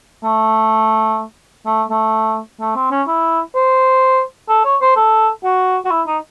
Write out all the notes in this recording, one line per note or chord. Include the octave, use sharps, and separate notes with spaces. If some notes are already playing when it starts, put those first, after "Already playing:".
A3
A3
A3
A3
C4
C#4
E4
C5
A4
C#5
C5
A4
F#4
F#4
E4
D#4